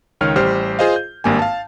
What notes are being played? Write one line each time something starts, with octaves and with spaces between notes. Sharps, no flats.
C#2 D#3 C#5 F6
A1 G3 G4 C5 F6
F4 G#4 C5 D#5 F5
G6
G#1 G2 A#3 G4 G#5
F5 A5